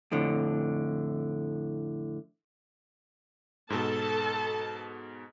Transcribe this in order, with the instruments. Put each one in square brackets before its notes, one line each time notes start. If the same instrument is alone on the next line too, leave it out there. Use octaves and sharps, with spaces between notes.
[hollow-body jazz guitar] F2 A2 D3
[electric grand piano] G#2 B2 [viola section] A4 A5